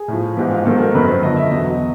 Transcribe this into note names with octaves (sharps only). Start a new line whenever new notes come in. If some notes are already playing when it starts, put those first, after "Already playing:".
Already playing: G#4
A2 F3
G#2 E3 G4
F4
G#2 D#3 F#3 A4
A#4
F#2 D#3 F#3 B4
C5
F#2 D3 F3 D#5
E5
E2 B2 F#3 D#5